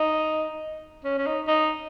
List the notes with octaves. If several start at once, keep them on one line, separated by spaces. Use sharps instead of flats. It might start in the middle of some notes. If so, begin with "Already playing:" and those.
Already playing: D#4
C#4
C#4
D#4
D#4